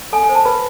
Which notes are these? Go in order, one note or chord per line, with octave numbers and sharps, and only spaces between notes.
A4 G#5
G#5
C5
A5
B4 B5